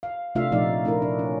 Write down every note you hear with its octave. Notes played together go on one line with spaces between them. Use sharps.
F5
C3 A3 D4 F4 E5 F5
A#2 F3 A3 D#4 D5 F5
A3 D4 E4 A#4
D4
C#4